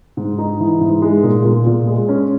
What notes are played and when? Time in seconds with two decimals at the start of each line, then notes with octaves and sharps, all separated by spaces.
0.17 G#2
0.38 D#4
0.60 E3
0.81 G#2
1.02 G#3
1.23 A#2
1.45 A#2
1.66 A#2
1.87 G#3
2.09 C#4